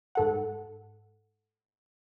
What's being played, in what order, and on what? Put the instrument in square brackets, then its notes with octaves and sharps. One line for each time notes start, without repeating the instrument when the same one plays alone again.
[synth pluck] G#2 A4 F#5